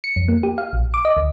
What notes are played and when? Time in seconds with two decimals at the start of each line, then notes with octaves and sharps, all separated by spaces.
0.04 C#7
0.16 F2
0.28 A#3
0.43 G4
0.58 F5
0.73 A#1
0.94 D6
1.05 D#5
1.17 D2